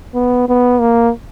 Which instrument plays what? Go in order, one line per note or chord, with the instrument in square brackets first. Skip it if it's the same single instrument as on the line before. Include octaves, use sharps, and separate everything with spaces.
[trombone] B3
B3
A#3